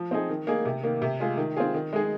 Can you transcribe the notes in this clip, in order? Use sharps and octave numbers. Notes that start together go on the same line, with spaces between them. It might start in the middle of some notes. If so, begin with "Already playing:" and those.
Already playing: F3
C4 D#4 G#4
D#3
A#3 D#4 G#4
C3
D#3 A#3
C3
G#3 F4 G#4
D#3
C4 F4 G#4
D#3
G#3 D#4 G#4